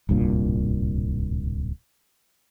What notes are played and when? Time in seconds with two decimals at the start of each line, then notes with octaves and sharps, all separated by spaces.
0.09 D1 C2 G2 A#2